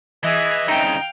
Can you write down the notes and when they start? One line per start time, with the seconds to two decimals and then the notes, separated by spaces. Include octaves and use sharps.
0.24 E3 G#4 D#5 E5
0.68 C2 C#3 D#4 F5 G5